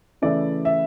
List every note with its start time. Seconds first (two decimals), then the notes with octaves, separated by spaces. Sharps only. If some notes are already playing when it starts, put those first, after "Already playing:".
0.22 C#3 E3 A3 E4 D5
0.65 E5